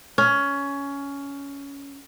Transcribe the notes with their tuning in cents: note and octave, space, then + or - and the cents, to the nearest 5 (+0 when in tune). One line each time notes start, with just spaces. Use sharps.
C#4 +15